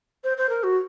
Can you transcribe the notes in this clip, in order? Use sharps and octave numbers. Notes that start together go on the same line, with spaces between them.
C5
C5
A#4
F#4